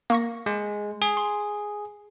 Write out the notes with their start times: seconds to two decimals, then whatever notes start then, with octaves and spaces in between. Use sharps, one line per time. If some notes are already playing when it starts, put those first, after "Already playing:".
0.10 A#3 C#6 A#6
0.46 G#3
1.02 G#4
1.17 C6